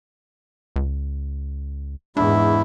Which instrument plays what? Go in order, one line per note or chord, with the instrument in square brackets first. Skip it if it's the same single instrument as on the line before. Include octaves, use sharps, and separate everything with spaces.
[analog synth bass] C#2
[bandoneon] E2 E4 [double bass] G#2 [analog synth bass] D4